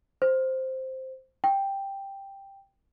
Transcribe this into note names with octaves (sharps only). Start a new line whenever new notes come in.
C5
G5